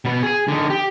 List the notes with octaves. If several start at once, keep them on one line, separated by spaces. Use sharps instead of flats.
B2 B3
G#4 G#5
D3 D#4
G4